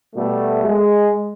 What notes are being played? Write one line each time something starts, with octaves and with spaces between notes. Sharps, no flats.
B2 G3 A3
G#3